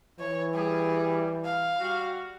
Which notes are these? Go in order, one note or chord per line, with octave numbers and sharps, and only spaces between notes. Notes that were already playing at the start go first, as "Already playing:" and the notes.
E3 C#5
G3 G#4
F5
G3 F#4